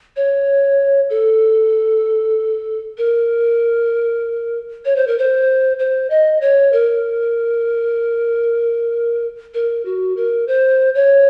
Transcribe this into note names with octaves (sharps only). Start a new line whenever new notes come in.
C#5
A4
A#4
C#5
C5
A#4
C5
C5
D#5
C#5
A#4
A#4
F#4
A#4
C5
C#5